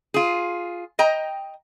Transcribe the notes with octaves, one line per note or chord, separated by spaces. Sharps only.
F4 G#4
D#5 G5 A#5